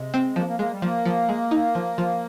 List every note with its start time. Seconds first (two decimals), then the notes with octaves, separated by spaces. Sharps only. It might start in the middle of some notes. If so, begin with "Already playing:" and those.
Already playing: C3 G#3
0.14 C4
0.36 F3 A#3
0.48 A#3
0.59 G#3 A#3
0.71 G3
0.82 F3 A#3
1.05 F3
1.29 G#3
1.51 D#4
1.75 F3
1.98 F3